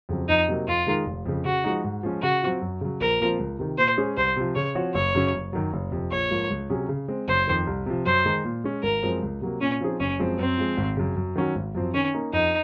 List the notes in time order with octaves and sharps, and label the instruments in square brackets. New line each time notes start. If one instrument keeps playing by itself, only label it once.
[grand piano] F2 C#3 F#3 C4
[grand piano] F2 [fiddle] D#4
[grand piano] C3 F#3 A#3
[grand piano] F2 [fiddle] F4
[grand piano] D#3 G#3 D#4 A#4
F1
F2 C#3
[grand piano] C#3 [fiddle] F#4
[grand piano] F3 G#3 D#4
G#2
F3 G#3 C#4
[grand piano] C#3 [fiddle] F#4
[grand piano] F#3 C4 F4
F#2
C#3 F#3
[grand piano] A#1 [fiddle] A#4
[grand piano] A#2 F3 C4 F4
C#2
C3 D#3
[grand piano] A#2 [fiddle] C5
[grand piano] G#3 C#4 G#4 C5
[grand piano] C2 [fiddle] C5
[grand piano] C3 F3
[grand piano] C#3 [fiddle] C#5
[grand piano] F3 C4 F#4 C#5
[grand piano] F#1 [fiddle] C#5
[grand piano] F#2 C#3 F#3 C#4
F#1
F#2 D#3 F#3
F#1
F2 C3
[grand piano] A#1 [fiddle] C#5
[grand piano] G#2 F3 A#3 F4
C#2
C3 F#3 C#4 G#4
C#3
G#3 C4
[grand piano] F#1 [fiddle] C5
[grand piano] F2 D#3
C2
C3 F3
[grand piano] F#2 [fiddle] C5
[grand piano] D#3 G#3 D#4
A#2
G#3 C#4
[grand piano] G#1 [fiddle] A#4
[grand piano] F#2 F3 G#3 C4
C#2
C3 F#3 A#3
[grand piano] A#2 [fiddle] C#4
[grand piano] F3 C4 D#4 G#4
[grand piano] F#1 [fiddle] C#4
[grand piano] F#2 F3 G#3 C4
[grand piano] F#2 [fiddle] C4
[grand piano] F3 G#3
G#1
F#2 C#3
F#2
D#3 F#3 C#4 F#4
G#1
F#2 F3 C4
[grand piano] D#3 [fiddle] C#4
[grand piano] A#3 D#4
[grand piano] F2 [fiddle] D#4